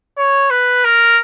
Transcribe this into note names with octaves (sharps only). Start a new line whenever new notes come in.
C#5
B4
A#4